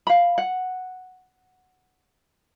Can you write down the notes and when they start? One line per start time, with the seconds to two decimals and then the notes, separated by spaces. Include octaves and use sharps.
0.07 F5 B5
0.38 F#5